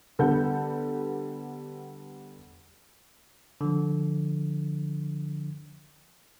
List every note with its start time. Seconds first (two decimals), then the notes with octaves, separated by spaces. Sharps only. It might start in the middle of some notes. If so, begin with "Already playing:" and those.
0.19 D3 G3 B3 A4 F#5 G6
3.61 D3 F3